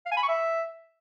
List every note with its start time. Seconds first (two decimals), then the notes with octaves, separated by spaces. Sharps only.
0.06 F5
0.12 G#5
0.17 B5
0.23 C#6
0.28 E5